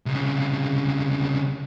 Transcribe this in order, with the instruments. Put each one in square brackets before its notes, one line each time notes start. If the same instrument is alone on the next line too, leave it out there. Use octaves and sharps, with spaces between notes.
[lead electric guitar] C2 C#3